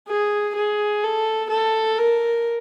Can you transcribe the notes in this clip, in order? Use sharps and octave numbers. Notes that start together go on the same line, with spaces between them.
G#4
G#4
A4
A4
A#4